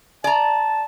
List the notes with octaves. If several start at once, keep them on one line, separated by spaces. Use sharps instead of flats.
D5 A5 A#5